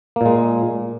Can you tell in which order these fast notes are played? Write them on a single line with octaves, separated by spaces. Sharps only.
A#3 A#2 G#3